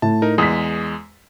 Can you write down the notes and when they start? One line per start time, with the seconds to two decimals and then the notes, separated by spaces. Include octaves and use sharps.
0.02 A2 A5
0.22 D#4 A#4
0.38 E2 G#3 D#6 B6